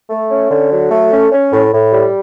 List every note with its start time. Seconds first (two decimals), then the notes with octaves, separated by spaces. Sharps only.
0.10 A3
0.31 C#4
0.50 D3
0.71 F#3
0.91 A3
1.12 C#4
1.31 C#4
1.52 A2
1.73 A2
1.92 G3